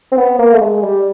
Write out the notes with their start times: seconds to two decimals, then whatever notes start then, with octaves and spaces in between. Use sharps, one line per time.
0.12 C4
0.17 B3
0.39 A#3
0.53 A3
0.61 G#3
0.83 G3